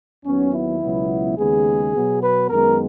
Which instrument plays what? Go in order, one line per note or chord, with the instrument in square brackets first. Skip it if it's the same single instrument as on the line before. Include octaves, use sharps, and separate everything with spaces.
[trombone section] D#2 D#3 F#3 B3 C#4
E4
C#2 B2 F#3 B3
D#2 C#3 G#3 B3 G#4
B2 F#3 B3
B4
F#2 D#3 G#3 B3 A#4